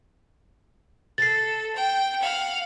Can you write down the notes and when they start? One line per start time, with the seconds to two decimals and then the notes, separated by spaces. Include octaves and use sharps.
1.18 A4 A6 C7
1.76 G5
2.21 F5 F#5